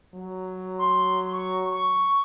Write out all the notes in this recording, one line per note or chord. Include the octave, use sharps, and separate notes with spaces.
F#3
C6
C#6
C#6